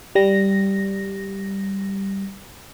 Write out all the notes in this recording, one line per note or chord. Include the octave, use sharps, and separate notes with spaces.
G3 A#6